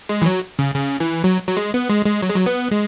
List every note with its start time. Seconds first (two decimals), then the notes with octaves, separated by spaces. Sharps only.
0.09 G#3
0.22 E3
0.26 F#3
0.59 C#3
0.75 C#3
1.00 E3
1.24 F#3
1.48 F#3
1.57 G#3
1.74 B3
1.90 G#3
2.06 G#3
2.22 F#3
2.29 G#3
2.36 F#3
2.46 B3
2.71 G#3